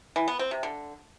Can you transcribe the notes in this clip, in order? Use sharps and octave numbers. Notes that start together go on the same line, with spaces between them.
E3
B3
C4
C3
D3